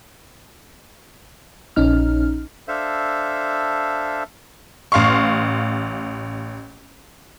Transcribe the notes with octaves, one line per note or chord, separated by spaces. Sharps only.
A#1 C#4 D#4 F6
D4 A4 C5 E5 F5
A1 F5 C6 C#6